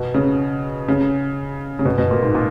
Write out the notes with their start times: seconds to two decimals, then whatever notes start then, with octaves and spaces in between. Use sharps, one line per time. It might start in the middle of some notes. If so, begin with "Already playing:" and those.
Already playing: B2
0.14 C#3
0.88 C#3
1.79 C#3
1.85 B2
1.98 B2
2.11 A#2
2.22 G#2
2.35 A#2